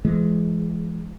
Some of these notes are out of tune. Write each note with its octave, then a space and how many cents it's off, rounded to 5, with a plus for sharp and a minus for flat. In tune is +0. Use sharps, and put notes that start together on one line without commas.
E3 +40 G#3 +15